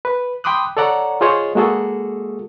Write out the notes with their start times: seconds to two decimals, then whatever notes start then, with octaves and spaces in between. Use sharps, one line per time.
0.05 B4
0.44 G5 B5 C6 D6 D#6 F#6
0.77 A4 C#5 D5 F#5 A#5
1.21 F4 G#4 C5 C#5 D#5
1.55 G#3 A#3 F#4 G#4 A4